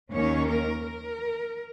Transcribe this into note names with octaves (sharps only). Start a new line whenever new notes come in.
D#2 D#3 A#3 C#4 C#5
A#4
A#4